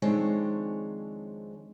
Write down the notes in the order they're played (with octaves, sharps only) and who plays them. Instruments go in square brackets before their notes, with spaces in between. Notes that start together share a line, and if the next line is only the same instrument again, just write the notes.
[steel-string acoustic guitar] F2 D#3 G#3 C4 D4 C#5